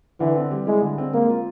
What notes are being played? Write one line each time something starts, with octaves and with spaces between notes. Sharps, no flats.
D3 E3
C4
G3
G#3 E4
D3
C4
G#3 A#3
F4